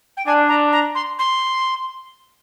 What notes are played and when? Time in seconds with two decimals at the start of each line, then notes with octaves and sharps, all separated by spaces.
0.17 G5
0.26 D4 G#5
0.49 A#5
0.72 A#5
0.95 C6
1.19 C6